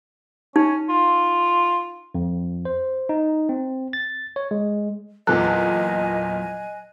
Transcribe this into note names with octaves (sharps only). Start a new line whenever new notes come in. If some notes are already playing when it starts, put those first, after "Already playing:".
C#4 D#4
F4
F2
C5
D#4
C4
A6
C#5
G#3
E2 A#2 F#3 A4 D#5 G#5 F#6